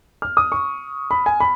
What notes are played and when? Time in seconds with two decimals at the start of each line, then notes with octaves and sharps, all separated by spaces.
0.22 F6
0.37 D#6
0.52 C#6
1.11 B5
1.26 G#5
1.40 B5